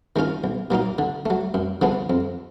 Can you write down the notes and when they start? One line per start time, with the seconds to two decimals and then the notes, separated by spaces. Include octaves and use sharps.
0.16 D#3 G#3 C#4 F4
0.44 B1
0.70 A#2 F#3 A#3 D#4
0.98 D3
1.26 F#3 A3
1.54 F#2
1.81 D3 F3 G#3 B3
2.10 F2